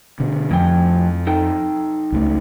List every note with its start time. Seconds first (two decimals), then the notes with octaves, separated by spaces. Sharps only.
0.20 B2 D3
0.51 F2 A2 F3 G5
1.27 D#4 A4 G5
2.12 C#2 F#3 A3